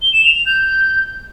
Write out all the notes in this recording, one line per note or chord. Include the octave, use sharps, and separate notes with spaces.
G7
E7
F7
F7
G6